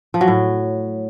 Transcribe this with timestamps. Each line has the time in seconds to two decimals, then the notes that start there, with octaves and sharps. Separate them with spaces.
0.14 F3
0.21 F#3
0.28 A2